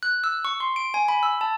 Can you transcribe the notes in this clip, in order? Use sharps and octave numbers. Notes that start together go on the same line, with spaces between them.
F#6
E6
C#6
C6
D7
G#5
B5
E6
A5